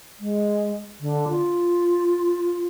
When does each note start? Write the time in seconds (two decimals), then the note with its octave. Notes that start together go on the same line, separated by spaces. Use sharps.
0.20 G#3
1.00 D3
1.29 F4